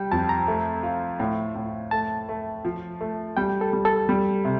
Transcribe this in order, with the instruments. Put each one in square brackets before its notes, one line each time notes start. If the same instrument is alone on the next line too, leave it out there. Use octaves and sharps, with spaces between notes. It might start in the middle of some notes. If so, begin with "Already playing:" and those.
Already playing: [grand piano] G3 [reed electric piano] G5
[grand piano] F2 [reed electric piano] A5
[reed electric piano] A#5
[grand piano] A3
F4
A2
A2
[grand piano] A3 [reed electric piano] A5
[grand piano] A3
F3
A3
[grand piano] G3 [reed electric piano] G5
[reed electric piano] A4
[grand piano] G3
[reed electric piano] A4
[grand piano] G3
C3